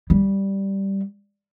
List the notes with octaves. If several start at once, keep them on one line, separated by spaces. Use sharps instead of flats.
G3